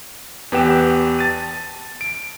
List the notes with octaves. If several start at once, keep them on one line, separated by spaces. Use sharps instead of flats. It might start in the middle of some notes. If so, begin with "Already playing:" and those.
E2 B3 G4 B4 G5 E7
A5 A6 D#7
D7